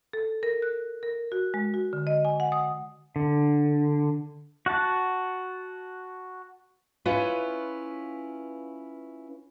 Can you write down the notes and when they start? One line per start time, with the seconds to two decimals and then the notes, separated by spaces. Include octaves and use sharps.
0.13 A4
0.43 A#4
0.62 F#6
1.03 A#4
1.32 F#4
1.54 G#3
1.74 F#4
1.93 D3
2.07 D#5
2.25 G#5
2.40 F#5
2.52 D#6
3.16 D3
4.66 F#4 F#5 A5
7.05 C#4 E4 F4 B4